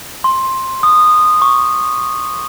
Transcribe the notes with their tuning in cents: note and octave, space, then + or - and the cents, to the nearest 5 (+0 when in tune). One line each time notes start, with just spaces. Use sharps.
C6 +10
D#6 -15
C#6 +0